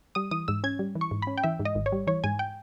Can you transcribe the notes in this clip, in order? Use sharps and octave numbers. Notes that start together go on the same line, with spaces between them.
G3 D#6
E3 D#6
G#2 E6
C#4 G#6
G3
E3
C#6
G#2
B5
C#4
G5
E3 E5
G#2
D#5
G#1
C#5
G3
E3 C#5
G#2 G#5
G5